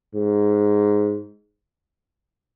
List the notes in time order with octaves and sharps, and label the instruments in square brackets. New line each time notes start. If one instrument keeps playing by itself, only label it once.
[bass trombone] G#2